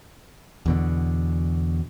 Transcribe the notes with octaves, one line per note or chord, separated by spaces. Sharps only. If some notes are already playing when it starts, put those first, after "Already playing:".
E2 B2 D3